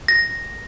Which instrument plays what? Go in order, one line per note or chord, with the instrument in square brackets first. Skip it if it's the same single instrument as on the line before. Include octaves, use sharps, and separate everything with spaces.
[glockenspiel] A#6